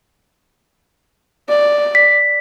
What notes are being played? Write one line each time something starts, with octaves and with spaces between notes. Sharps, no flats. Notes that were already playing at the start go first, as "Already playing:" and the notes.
D5
B6